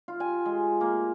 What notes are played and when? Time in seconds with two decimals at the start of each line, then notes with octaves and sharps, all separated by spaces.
0.08 F4
0.20 G#5
0.46 G#3
0.81 A#3